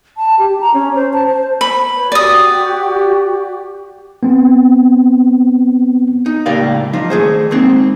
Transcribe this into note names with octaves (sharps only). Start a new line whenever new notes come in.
A5
G4
A#5
C#4
C5
A5
C5
B5
B4 C#5
F#4 G4 D5 D#6
B3 C4
D#4
C#2 A2 A#3 G4 D5 F5
F3 D4 D#4 F4
D#3 A3 G#4 C5
G#3 A#3 C4 D#4